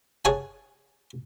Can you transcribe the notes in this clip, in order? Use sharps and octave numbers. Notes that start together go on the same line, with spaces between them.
G#4 C#5 F#5 G#5 A5